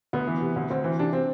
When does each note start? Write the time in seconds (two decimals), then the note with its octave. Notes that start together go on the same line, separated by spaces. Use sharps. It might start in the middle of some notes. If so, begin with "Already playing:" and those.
0.13 D2 B3
0.27 E3
0.41 C3
0.56 D2
0.70 D2 C4
0.84 E3
0.99 C3 D4
1.13 C4